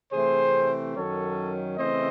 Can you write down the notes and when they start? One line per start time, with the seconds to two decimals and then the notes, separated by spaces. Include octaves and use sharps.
0.12 C3 E3 A3 C4 G#4 C5
0.95 F#2 D#3 F#3 C#4 A4 C#5
1.78 C#3 E3 A3 C4 C5 D#5